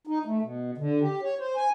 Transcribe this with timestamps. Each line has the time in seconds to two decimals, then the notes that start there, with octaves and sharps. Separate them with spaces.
0.07 D#4
0.25 A3
0.42 B2
0.78 D3
1.01 G4
1.22 C#5
1.39 C5
1.56 G#5